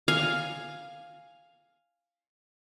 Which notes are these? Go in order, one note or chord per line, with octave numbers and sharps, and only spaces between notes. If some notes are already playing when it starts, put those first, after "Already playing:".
F5 G#5